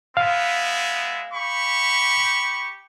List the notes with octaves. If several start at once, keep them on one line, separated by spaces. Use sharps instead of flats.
G#3 B3 E5 F5
G4 B5 C#6